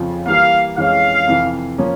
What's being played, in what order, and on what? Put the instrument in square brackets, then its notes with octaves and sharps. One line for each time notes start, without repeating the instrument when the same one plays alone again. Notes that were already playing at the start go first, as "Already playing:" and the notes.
Already playing: [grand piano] F2 C#3 F3 F4
[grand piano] E3 G3 A#3 [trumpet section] F5
[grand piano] F2 E3 G#3 C#4 [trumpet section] F5
[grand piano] F2 C3 E3
F3 A#3 C#4